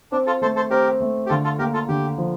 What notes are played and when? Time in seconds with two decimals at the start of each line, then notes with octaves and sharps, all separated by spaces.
0.12 C4 D4
0.26 F4 A4
0.42 A3 A4 C5
0.56 A4 C5
0.70 C4 G4 A#4
1.01 A3
1.26 G4
1.29 D3 F4 A4
1.44 F4 A4
1.59 A#3 G4 A#4
1.74 F4 A4
1.89 D3 G4
2.18 F3